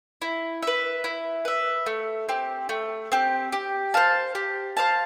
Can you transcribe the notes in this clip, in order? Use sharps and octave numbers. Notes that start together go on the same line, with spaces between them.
E4
B4 E5
E4
B4 E5
A3
C4 G4
A3
C4 G4
G4
C5 F5 A5
G4
C5 F5 A5